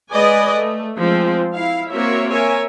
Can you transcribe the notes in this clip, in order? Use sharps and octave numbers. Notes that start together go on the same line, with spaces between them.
G#3 B4 D5 D#5 G#5
A3
F3 G#3 C4
E4 F5
A#3 C4 F#4 A#4 C#5 E5
A#4 C#5 E5 G#5